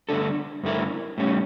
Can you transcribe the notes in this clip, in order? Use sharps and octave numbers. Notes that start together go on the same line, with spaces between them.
G2 D3 A3 D4 A4
G2 D3 A3 E4 A#4
A2 G3 C#4